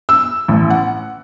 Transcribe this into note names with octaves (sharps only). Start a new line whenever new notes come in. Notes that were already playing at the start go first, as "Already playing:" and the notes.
E6
A1
F#5